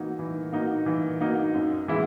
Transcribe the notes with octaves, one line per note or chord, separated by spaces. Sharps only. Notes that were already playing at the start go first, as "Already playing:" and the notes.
Already playing: E3 A#3 D#4 F#4
E3
A#3 D#4 F#4
E3
A#3 D#4 F#4
F#2
E3 G#3 B3 E4